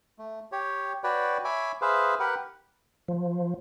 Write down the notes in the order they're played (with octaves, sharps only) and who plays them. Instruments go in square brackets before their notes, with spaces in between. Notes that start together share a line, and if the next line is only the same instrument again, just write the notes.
[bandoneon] A3
G4 C#5
F#4 B4 C#5 D5 G5
C#5 E5 G#5 B5 D6
G#4 B4 C5 E5 F5
G4 A#4 B4 F#5
[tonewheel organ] F3